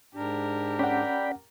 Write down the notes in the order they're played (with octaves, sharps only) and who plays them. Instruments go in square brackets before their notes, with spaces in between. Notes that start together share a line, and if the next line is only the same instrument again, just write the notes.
[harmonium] G#2 D4 [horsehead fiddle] G4 A#4
[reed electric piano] C#4 F#5 [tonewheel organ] D5 G5 B5